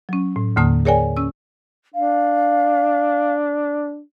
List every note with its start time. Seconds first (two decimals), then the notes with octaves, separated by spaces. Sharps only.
0.09 F#3 C#4
0.36 A2
0.56 D#2 A2 D3 A#3 A5 D#6
0.85 G#4 A#4 C#5 D5 G5 G#5
1.17 C#4 E6
1.94 D4 F5